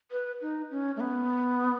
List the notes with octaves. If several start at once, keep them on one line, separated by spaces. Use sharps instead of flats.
B4
D#4
C#4
A3
B3